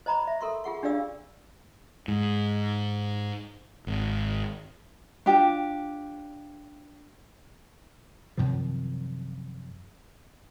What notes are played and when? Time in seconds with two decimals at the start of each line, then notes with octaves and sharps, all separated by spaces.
0.06 C5 D#5 A#5 B5 C#6
0.27 E5
0.41 A4 A#4 C6 C#6
0.64 F4 G#4 F#5 C#6
0.83 D4 G4 G#4 D5 F5 E6
2.08 G#2
3.87 G#1
5.26 D4 F4 G4
8.37 F#2 C3 D#3 F3